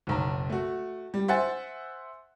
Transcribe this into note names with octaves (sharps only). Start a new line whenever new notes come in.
F#1 B1 A#5
A3 F#4
G3
C5 E5 F#5 G#5 A6